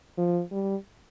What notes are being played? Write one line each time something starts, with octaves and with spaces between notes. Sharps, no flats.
F3
G3